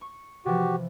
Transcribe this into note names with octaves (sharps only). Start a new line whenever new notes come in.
C#6
C3 E3 F3 F#4 G4